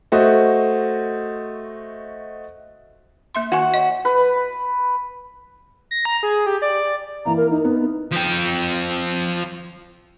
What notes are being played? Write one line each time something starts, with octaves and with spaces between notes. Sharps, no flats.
A3 F#4 C5 D#5
A#3 E5 C6
D#3 F#4 G#5
C#5 D#5
B4
A#6
A#5
G#4
G4
D5
E3 A#3 E4 A#5
A#4
D#4
B3
F3 G5